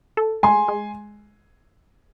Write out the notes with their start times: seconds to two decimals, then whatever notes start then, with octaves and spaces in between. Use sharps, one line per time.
0.17 A4
0.43 G#3 G#5 C6
0.68 G#3